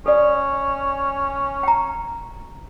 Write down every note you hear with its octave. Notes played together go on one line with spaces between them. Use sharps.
C#4 A4 D5
G5 A#5